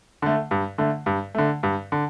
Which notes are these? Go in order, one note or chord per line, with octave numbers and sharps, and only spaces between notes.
D3 A3
G2
D3 A3
G2
D3 A3
G2
D3